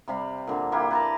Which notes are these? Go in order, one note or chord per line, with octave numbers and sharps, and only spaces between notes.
C3 G3 F5 B5
A#2 D3
A#3 E4 G4
B4 A5 A#5